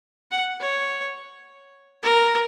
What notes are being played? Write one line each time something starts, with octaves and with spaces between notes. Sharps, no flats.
F#5
C#5
A#4